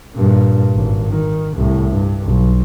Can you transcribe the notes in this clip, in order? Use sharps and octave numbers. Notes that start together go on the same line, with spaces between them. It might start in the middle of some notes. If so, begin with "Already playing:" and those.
G2 A#2
G#1
D#3
C2 A2
G2
B1